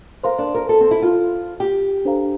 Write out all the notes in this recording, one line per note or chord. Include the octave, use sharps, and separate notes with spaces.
A#4 C5 F5 C6
D4
A#4
A4
C4
E4
F4
G4
D4 A4 C5 F5 A#5